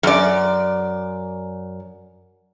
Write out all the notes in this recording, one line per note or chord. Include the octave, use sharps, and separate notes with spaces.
F#2 D5